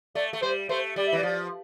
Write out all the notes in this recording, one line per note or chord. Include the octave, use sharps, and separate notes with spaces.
A3 D5
A3
G3 C5
A3 C5
G3 D5
E5
E3
D5
F3